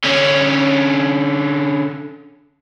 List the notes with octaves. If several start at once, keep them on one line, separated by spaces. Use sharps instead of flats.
D3 C#4